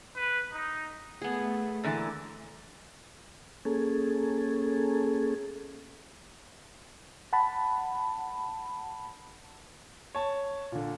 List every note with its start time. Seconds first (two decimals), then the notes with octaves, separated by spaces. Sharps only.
0.17 B4
0.52 D#4
1.22 A3 B3 G#4
1.84 A#2 D3 E3
3.65 A#3 C#4 G#4 A4
7.33 F#5 A5 B5
10.15 C#5 A5
10.72 A#2 D3